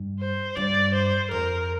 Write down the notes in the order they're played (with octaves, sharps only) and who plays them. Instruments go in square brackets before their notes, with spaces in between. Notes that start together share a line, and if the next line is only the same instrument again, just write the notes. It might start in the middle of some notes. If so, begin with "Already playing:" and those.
Already playing: [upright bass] G2
[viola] C5
[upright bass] G2 [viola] D5
[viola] C5
[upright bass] F2 [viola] A#4